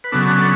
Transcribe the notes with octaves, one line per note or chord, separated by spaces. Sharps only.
B4
C#3 F#3 B3 D4 A4
A4